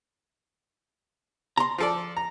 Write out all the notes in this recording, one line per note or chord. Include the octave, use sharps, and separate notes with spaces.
A#5 C6
F3 A4 D5
A#5